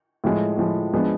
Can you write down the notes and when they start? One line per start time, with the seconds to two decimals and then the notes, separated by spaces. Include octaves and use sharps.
0.24 A2 F3 G#3
0.58 A2 F3 G#3
0.93 F3 G#3 B3 D4